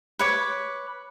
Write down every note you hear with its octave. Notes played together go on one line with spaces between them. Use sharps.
B4 C#5 D6